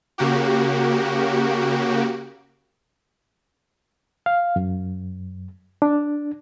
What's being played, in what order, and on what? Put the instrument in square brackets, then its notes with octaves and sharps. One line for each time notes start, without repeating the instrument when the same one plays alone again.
[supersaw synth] C#3 A#3 F#4 G4
[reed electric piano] F5
F#2
D4